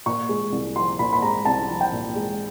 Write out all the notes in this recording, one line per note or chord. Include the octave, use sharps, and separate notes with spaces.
A#2 C#6
G#3
C2
F3 C6
A#2 B5
B5
G#3 A#5
C2 A5
F3
G5
A#2
G#3